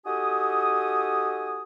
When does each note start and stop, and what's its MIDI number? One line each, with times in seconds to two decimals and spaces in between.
0.06 1.63 63
0.06 1.63 66
0.06 1.63 67
0.06 1.63 69
0.06 1.63 80
0.06 1.63 87